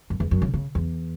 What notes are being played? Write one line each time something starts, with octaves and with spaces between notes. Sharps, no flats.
F#2
E2
F#2
C#3
C#3
E2